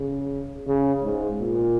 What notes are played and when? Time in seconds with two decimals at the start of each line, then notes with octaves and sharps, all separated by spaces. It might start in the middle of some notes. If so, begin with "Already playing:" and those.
Already playing: C#3
0.67 C#3
1.03 G#2
1.40 A#2